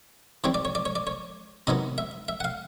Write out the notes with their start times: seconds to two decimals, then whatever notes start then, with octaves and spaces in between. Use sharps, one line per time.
0.44 E3 G3 C4 C#5
0.54 D5
0.65 C#5
0.75 D5
0.85 C#5
0.95 D5
1.07 C#5
1.67 C3 D#3 F#3 B3 D#5
1.98 E5
2.28 E5
2.40 F#5
2.44 F5